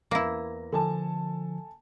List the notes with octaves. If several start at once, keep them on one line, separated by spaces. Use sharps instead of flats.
E2 A#3 E4 A#6
D3 F3 A4 G#5 A5